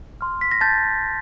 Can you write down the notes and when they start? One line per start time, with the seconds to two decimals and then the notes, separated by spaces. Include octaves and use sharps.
0.21 C6 F6
0.41 B6
0.51 A#6
0.61 A5 G6 A6